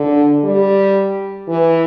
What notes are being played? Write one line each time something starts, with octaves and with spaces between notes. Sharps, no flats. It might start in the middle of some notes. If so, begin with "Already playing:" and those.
Already playing: D3
G3
E3